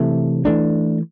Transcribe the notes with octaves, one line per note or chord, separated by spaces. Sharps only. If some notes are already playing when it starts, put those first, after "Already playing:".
Already playing: C3 E3 A3
E3 A3 D4